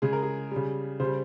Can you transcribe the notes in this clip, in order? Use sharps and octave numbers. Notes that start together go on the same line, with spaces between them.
C#3 G#3 G#4
A#4
G#4
C#3 G3
C#3 G3 C5